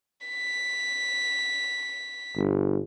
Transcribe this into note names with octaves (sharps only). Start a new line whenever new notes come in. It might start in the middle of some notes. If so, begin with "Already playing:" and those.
B6
G1